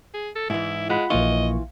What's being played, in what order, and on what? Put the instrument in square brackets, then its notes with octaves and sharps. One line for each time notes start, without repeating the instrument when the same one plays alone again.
[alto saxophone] G#4
A4
[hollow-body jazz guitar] G#2 E3 [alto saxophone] E4
[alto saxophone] G#3 [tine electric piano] F4 F#5 B5
[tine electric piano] A#1 A#3 C#6 [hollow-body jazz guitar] E3 F4 [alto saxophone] D#5